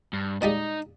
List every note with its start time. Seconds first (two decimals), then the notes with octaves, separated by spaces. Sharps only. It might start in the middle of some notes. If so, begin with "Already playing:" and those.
0.13 G2
0.42 A#2 G3 G#3 D#4